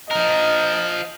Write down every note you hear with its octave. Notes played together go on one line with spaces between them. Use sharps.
F3 A#4 D#5